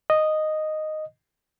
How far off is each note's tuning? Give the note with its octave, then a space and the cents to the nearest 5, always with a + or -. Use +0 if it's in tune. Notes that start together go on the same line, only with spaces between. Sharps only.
D#5 -5